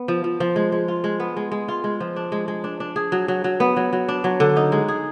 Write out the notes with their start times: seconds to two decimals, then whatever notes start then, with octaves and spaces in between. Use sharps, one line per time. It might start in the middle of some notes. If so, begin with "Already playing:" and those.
Already playing: B3
0.08 F3
0.24 F3
0.40 F3
0.56 G#3
0.72 G#3
0.88 F4
1.04 G#3
1.20 B3
1.37 G#3
1.52 G#3
1.68 F4
1.84 G#3
2.00 F3
2.16 D4
2.32 G#3
2.48 G#3
2.64 D4
2.80 D4
2.96 G#4
3.12 F#3
3.28 F#3
3.44 F#3
3.60 B3
3.76 F#3
3.93 F#3
4.08 D4
4.24 F#3
4.40 D3
4.57 D#4
4.72 G#3
4.88 G#4